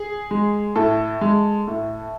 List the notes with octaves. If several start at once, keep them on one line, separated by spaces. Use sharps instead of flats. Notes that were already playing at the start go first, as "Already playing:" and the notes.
Already playing: G#4
G#3
A2 A4
G#3
A2